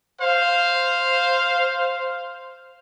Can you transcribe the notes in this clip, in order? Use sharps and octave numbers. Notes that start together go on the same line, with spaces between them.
C5 F5